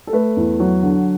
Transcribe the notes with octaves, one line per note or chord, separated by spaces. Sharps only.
A4
A3 B4
E2
F#3
D3